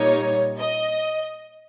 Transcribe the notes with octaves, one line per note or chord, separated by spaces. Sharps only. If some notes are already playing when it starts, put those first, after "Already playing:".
Already playing: A#2 G3 A#3 D#4 C#5
D#5